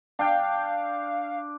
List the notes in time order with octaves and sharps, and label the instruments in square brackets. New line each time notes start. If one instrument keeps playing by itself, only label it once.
[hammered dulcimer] D4 G5 [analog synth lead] F5